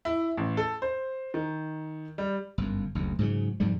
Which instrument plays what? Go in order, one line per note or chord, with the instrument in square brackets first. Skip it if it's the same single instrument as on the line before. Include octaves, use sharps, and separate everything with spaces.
[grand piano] E4
A1
A4
C5
D#3
G3
[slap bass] G1 F#2
F#1 D2
G#2 C#3 F3 F#3
F2 G#2 D3 G3